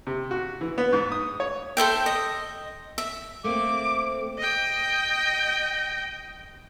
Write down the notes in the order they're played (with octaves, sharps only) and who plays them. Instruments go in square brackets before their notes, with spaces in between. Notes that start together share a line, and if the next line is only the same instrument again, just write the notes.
[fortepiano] C3
F#4
E3
B3
G#2
D#6
C#5
[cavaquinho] A4 C5 E5 G5
D#5
E5
[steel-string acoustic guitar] A3 A#3 C4 [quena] D6
[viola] D#5 G5